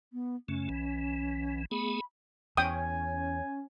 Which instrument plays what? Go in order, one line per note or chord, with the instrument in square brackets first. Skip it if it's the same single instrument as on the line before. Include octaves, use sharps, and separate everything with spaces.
[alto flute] B3
[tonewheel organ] F#2 C#3 A3 [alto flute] C#4
[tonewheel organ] B1 E3
[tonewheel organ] A3 B3 G#4 [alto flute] B5
[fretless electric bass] E2 [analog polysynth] C#4 [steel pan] G5 D#6 [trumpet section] G#5